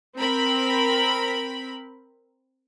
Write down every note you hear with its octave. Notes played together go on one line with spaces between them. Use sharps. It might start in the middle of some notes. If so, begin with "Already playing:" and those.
C4 A#4 B5